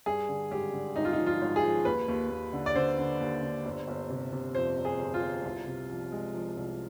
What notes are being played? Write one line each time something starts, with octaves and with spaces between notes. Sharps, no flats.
G2 G#4
D3
G#1 G4
D3
G#1 D#4
F4
D#4
F3
F4
G#1
G#4
F3
D#2 B4
D#2
D#2
D3
D5
D3 C5
D3
D#2
D3
G1
G1
C3
C3
F2 C5
G1
G#4
G1
F4
G1
C2
C3
F3
G#3
F3
C2